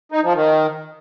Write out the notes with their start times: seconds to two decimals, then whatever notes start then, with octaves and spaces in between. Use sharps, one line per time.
0.12 D#4
0.23 F3
0.35 D#3